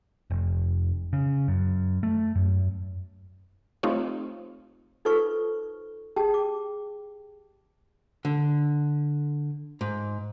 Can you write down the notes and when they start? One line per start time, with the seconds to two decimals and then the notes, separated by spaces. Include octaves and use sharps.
0.30 F1
1.13 C#3
1.48 F#2
2.03 A3
2.35 F#2
3.83 A3 C4 D#4 F4 G4 C#5
5.05 D#4 F4 A4 B4 C5 C#6
6.16 G4 G#4 G5 A5
6.34 D6
8.25 D3
9.81 G#2